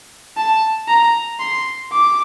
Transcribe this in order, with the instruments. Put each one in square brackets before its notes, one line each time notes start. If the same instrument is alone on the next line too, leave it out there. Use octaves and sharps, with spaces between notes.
[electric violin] A5
A#5
C6
D6